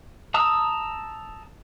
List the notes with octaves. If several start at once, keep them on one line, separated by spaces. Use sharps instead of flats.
A5 A#5 D#6 E6